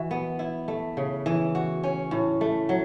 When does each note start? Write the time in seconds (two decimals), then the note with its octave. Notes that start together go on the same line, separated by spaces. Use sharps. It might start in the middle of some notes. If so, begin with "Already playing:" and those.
Already playing: E3 F#4
0.11 B3
0.39 E4
0.68 A3
0.97 C#3
1.26 E3
1.55 F#4
1.84 C#4
2.11 A2
2.41 A3
2.69 F#3